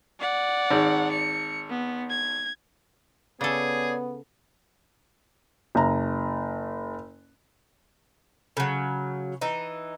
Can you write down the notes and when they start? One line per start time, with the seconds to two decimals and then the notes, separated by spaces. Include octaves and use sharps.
0.20 D5 F#5
0.71 G#1
1.12 C#7
1.70 B3
2.10 G#6
3.41 C#3 B3 G#4 A4 C#5 D5
5.75 F#1 A#5
8.57 C#3 F#3
9.41 E3 D#4